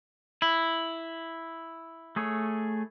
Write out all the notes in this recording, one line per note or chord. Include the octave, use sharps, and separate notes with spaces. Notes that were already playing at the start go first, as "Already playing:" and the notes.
E4
A3 G#4 C#5